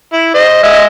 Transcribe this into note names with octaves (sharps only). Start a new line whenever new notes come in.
E4
C5 D#5
G#3 D#5 E5